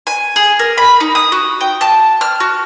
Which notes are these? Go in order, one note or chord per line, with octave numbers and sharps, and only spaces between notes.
G#5
G#4
A#4
B5
D#4
D#6
F#4
G5
A5
F6
F#4